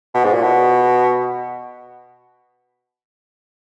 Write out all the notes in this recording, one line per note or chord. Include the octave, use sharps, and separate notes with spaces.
B2
G#2
A#2
B2